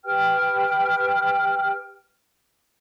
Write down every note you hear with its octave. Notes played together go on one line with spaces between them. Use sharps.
G4 B4 G5 F6